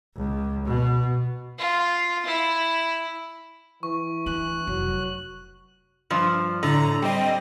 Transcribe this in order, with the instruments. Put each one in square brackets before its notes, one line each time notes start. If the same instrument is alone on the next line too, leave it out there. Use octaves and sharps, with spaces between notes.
[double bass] C#2
B2
[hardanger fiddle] F4
E4
[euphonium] E3 [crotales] C#6
[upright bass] D4 [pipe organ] F#6
[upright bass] F1 [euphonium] F#3
[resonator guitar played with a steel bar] G2 F3
[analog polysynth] A2 A#5 [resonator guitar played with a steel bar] D3
[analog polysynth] G3 C4 D#5 [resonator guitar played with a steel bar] G4